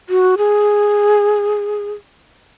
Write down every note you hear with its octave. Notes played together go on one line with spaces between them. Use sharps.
F#4
G#4